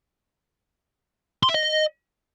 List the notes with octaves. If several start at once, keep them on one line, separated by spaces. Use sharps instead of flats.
C6
E5
D#5